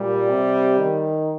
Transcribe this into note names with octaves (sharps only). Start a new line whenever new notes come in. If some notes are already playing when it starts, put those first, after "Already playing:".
Already playing: A#2 G3
C3
D#3